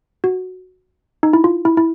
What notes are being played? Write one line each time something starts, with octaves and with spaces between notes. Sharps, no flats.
F#4
D#4
E4
F4
E4
E4